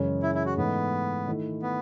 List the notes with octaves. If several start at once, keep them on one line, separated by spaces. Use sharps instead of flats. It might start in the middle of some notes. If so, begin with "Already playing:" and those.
Already playing: F#2 C#3 E3 G#3 C#4
E4
E4
F#4
G#2 E3 A3 B3 D#4
D#3 A3 E4
B3